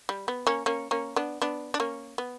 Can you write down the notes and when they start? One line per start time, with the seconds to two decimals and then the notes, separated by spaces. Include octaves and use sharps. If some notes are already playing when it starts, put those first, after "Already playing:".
0.09 G3
0.28 B3
0.47 A#3 C#4
0.66 A#3 C#4
0.91 A#3 C#4
1.16 B3 D4
1.42 B3 D4
1.74 D4
1.80 A#3 C#4
2.18 B3